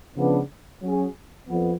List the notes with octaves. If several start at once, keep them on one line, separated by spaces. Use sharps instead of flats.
C#3 F3 B3 D4
F#3 C#4 G#4
F2 B3